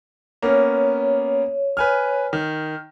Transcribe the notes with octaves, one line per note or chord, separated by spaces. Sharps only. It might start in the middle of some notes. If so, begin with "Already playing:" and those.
A#3 B3 C#4 C#5
B4 G#5 F6
D#3